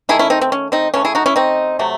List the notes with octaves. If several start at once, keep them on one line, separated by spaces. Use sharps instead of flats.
D#3 A3 E4 G#4
C#4 E4
C4 D#4
C4
C#4
C4 D#4
C#3 E3 A3 C#4
E4 G#4
D#4 F#4
C#4 E4
C4 D#4
C3 F#3 A3